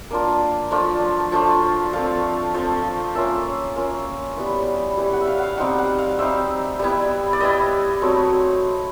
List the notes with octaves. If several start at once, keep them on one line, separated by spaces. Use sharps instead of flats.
A#3 D4 F4
F3 A3 D4 F4
F3 A3 D4 F4
F3 A3 C4 F5
F3 A3 C4
A#3 C#4 F4 E5
A#3 C#4 F4
G3 B3 E4
G3 B3 E4
F#5
E5
F5
F5 F#5
G3 C4 D#4 F#5
F#5
F5
G3 C4 D#4 E5
G3 B3 E4
D5
G3 B3 E4 D#5
F#3 A3 C4